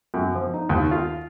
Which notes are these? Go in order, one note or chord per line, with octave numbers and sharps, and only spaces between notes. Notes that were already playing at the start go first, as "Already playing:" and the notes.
F#2
F3
D#4
D#2
F4